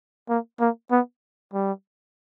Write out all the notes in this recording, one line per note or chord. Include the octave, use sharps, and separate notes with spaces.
A#3
A#3
B3
G3